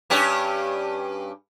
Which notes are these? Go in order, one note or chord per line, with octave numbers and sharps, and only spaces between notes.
G2 C#4 G4